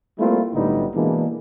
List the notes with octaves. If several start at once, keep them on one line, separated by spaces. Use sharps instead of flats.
G3 A3 A#3 C4 E4 F4
B1 A2 D3 G3 B3 D#4
B2 E3 G#3 A#3 D4